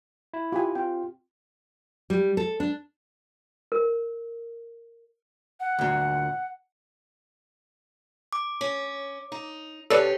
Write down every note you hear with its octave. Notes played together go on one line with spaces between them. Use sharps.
E4
F4 G4 G#5
C4 F4 G5
G3
A4
D4
A#4
F#5
D2 A#2
D6
C#4
D#4
D2 C#4 G4 A4 B4 C#5 D5 C#7